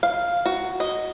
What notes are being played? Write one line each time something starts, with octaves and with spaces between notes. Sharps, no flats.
F5
F#4
D#5